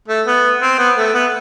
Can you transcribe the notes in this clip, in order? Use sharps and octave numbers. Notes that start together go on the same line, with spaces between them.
A3
B3
C4
B3
A3
B3